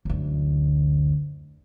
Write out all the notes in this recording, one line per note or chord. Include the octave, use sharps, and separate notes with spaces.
F#1 D2